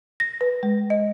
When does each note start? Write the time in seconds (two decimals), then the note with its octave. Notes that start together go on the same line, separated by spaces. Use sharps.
0.20 A#6
0.41 B4
0.63 G#3
0.90 D#5